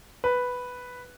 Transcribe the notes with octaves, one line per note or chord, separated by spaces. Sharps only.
B4